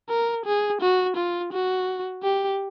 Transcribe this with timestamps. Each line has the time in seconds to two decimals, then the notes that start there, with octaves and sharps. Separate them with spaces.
0.09 A#4
0.46 G#4
0.82 F#4
1.17 F4
1.53 F#4
2.23 G4